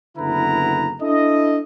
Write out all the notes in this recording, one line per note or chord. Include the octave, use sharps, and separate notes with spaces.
F#1 D3 B3 E4 B4 A#5
D4 E4 A4 D#5